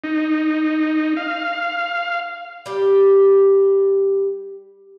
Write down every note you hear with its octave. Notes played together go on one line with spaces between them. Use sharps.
D#4
F5
G3 G4